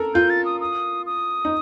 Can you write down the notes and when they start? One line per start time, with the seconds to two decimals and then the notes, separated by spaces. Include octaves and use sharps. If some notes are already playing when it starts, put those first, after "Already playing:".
Already playing: A4 A#4
0.15 F4 G6
0.30 A6
0.45 D#6
0.61 D#6
1.06 D#6
1.45 D#4